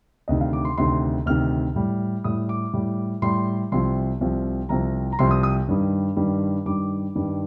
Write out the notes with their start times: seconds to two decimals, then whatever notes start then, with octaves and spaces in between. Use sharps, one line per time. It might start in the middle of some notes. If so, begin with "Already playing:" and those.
0.28 D2 C3 D#3 D#5
0.41 F5
0.53 D6
0.65 C6
0.78 D2 C3 D#3 C6
1.26 D2 C3 D#3 F6
1.76 A2 G3
2.24 A2 G3 D#6
2.49 D6
2.73 A2 G3
3.22 A2 G3 C6
3.72 C2 C3 F3 C6
4.21 C2 C3 F3
4.69 C2 C3 F3 A#5
5.12 A#5
5.19 C2 C3 F3 C6
5.31 D#6
5.43 D#6
5.68 G2 D#3 G3
6.16 G2 D#3 G3
6.66 G2 D#3 G3 D6
7.15 G2 D#3 G3